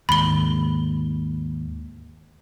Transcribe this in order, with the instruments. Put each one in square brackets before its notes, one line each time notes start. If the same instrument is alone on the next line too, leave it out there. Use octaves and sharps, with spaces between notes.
[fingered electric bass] D#2 G#2 [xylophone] B5 G7